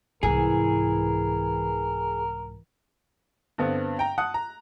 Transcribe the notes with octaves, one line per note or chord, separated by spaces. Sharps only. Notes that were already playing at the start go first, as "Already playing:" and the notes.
C2 G#2 E3 G#4 A#4
G2 D3 B3 C4
G5 A#5
F#5 A5 D#6 F#6
A#5